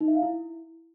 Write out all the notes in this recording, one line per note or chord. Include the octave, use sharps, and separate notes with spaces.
D#4
E5
F5
E4